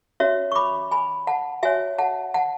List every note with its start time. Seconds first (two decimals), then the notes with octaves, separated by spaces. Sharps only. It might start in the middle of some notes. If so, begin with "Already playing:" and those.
0.20 C#4 F#4 C#5 E5
0.52 C#6
0.55 B5 D6
0.91 G#5 B5
1.27 F#5 A5
1.63 F#4 C#5 E5 G#5
1.98 F#5 A5
2.34 F#5 A5